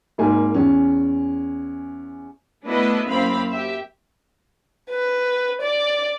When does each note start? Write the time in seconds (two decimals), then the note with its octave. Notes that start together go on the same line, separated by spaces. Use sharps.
0.18 G#1 G#2 A#3 G#5
0.54 E2 C#4
2.66 A3 B3 D4 E4 B4 D#5
3.08 F#2 A#3 C4 F5 B5
3.49 G4 E5
4.90 B4
5.62 D5